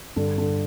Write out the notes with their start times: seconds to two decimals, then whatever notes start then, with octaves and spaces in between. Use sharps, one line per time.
0.16 G2 D3
0.38 D3